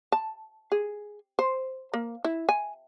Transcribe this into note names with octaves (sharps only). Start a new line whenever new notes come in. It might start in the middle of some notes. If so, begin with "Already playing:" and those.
A5
G#4
C5
A#3
E4
G#5